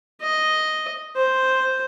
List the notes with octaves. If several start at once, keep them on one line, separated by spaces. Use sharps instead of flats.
D#5
C5